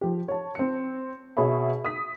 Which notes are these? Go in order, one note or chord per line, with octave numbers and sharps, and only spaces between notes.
F3 G4
C#5 A5
C4 C#7
B2 G#4 C#5 E5 B5
D#6 B6